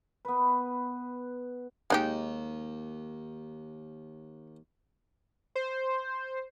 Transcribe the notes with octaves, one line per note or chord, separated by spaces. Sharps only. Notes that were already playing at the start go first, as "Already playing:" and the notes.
B3 B4
D#2 G#3 D#4 G4
C5